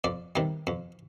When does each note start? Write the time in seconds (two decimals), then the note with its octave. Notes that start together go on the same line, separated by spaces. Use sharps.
0.04 F2 D5
0.36 C3 D#3 G3
0.67 F2